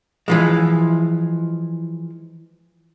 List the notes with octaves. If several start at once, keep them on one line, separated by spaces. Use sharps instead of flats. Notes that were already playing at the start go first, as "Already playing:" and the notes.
E3 F3 G#3